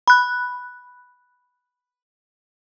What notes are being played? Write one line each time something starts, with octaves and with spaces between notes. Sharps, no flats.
B5 F#6